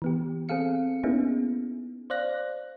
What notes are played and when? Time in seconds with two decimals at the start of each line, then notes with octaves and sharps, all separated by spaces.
0.02 E3 B3 G4
0.49 C4 G#4 A4 F5 C#7
1.04 A#3 B3 C#4 D#4 E4 G#4
2.10 C5 D5 F5 F#6 A#6